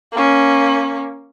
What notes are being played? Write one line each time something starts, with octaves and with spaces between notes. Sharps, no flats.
A#3 C#4